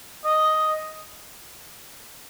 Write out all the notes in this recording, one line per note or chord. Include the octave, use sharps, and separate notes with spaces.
D#5